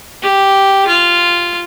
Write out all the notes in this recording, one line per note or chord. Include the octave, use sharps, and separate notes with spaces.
G4
F4